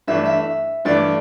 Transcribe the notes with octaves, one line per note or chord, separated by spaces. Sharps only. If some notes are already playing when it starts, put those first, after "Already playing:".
G2 E3 A3 D4 E5
E5
G2 E3 A3 D4 D5